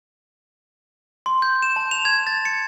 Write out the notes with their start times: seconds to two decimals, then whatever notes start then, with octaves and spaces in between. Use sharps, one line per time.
1.26 C6
1.42 G6
1.62 E7
1.76 A5
1.91 F7
2.05 G#6
2.27 A6
2.45 C#7